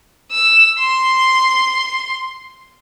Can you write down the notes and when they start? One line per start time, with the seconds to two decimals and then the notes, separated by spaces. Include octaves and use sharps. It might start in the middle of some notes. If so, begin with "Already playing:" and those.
0.32 E6
0.80 C6